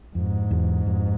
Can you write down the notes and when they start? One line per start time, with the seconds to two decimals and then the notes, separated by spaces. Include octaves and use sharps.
0.15 F2 G#2
0.51 E2
0.87 F2